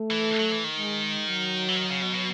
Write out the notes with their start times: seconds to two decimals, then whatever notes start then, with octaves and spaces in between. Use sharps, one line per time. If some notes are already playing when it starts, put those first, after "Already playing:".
Already playing: A3
0.11 E3
0.39 F#3
0.52 E3
0.64 D#3
0.77 G#3
1.28 F#3
1.68 E3
1.76 D#3
1.90 C#3
2.02 B2
2.14 B2